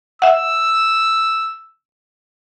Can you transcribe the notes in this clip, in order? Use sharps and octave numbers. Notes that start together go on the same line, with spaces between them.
E5 F#5 E6